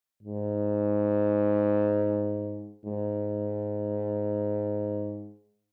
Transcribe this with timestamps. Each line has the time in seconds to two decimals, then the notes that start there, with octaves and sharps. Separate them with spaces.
0.23 G#2
2.85 G#2